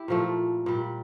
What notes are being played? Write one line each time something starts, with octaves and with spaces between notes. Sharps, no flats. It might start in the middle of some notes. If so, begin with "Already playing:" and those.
Already playing: E4 G4
A#2 F3 A3
A#2 G3